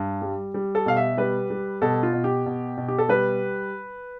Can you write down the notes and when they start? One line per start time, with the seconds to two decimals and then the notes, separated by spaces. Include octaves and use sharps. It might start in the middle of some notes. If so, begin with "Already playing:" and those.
Already playing: G2
0.22 G3
0.54 G3
0.75 A4
0.86 B2 F5
0.97 E5
1.18 G3 B4
1.50 G3
1.82 B2 A4
2.03 F4
2.13 B2
2.24 G4
2.46 B2
2.77 B2
2.88 G4
2.99 A4
3.09 G3 B4